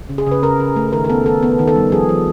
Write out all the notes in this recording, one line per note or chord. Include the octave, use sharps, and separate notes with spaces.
C#3
G#4
C#3 B4
C#3 A#4
C#3
A3
D#3 A#4
A#4
B3 A4
D#3 A4
B3
D#3
A4
G3
F3 G#4
F3